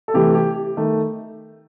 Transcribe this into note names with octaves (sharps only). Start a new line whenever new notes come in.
A4
C3 E3 A3 G4
G4
D#3 A3